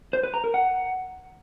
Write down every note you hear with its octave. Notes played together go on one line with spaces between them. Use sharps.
C5
B4
A#5
A#4
F#5